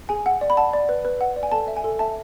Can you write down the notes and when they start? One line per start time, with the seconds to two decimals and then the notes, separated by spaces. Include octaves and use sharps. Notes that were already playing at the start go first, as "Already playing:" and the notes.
0.09 G#4 G#5
0.26 F#5
0.41 D5
0.50 B5
0.57 F#5 A5
0.73 D5
0.89 B4
1.05 B4
1.21 F#5
1.36 D5
1.43 G#5
1.52 A4 A5
1.68 E5
1.77 G#5
1.84 A4
1.99 E5 A5